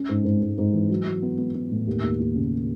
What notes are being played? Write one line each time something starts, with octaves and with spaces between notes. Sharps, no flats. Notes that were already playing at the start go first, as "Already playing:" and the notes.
Already playing: C#4
G#2
G#2
G#2
G#2
E3
F#3
F#3
B3
B3
B3
A2
D#2
D#2
D#2
C#3